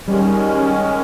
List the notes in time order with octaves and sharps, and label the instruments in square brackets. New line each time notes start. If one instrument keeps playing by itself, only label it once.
[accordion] D#3 G#3 C#4 [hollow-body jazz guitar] G3